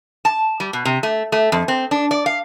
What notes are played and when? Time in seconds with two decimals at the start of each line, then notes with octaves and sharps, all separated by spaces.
0.25 A5
0.60 G3
0.73 B2
0.85 C3
1.03 A3
1.32 A3
1.52 F2
1.68 C4
1.91 D4
2.11 D5
2.26 F5